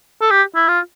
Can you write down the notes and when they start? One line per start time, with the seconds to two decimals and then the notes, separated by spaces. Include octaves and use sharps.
0.21 A4
0.31 G4
0.56 E4
0.68 F4